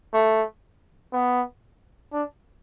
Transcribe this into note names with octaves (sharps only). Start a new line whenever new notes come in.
A3
B3
D4